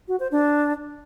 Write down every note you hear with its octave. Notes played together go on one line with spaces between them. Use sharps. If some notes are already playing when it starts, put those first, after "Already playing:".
F#4
C5
D4